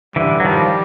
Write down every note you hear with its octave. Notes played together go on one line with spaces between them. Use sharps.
D3 E3 G3
F#3
D#3 F3 G3